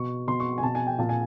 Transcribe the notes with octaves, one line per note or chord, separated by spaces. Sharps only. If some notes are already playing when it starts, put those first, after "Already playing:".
Already playing: B2 C#6
B2 C6
C#6
G#5
B2 A5
G#5
G5
A#2 A5
G#5